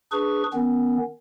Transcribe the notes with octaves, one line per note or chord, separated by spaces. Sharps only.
D4 G#4 B4 C#6
D#3 B3 C#4